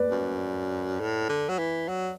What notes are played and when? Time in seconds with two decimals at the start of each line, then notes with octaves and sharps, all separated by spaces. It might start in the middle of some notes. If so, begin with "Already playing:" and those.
Already playing: B4 D5
0.11 F#2
1.00 A2
1.29 D3
1.49 F#3
1.59 E3
1.88 F#3